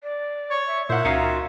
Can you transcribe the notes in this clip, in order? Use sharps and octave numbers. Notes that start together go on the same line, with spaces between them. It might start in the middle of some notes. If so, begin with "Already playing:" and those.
D5
C#5
E5
A#2 A#3 E4 C5 E5 F#5
C#2 C#4 D#4 F4 F#4 C#7